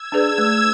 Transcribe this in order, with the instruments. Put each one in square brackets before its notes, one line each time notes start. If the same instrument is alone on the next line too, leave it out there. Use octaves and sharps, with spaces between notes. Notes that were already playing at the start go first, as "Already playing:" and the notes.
Already playing: [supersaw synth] E6 G#6
[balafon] D4 G#4 B4 D5
A3